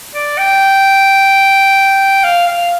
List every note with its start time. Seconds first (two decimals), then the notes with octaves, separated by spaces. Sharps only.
0.15 D5
0.38 G5
2.24 F5
2.48 F5